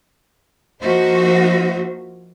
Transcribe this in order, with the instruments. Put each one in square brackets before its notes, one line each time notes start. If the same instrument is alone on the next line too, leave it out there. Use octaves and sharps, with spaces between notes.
[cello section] F3 A#3 D#4 F#4 C5 E5